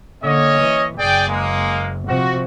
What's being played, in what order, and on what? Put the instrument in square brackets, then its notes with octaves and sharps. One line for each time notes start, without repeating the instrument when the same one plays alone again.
[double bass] D3 A#3 [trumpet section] C#4 C#5 D#5
[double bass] E3
[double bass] F#1 [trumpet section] G#4 D5 G5
[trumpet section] G#3 A#3
[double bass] C3 F3 [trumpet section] F#4